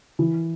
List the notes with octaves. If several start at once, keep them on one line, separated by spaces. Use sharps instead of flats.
E3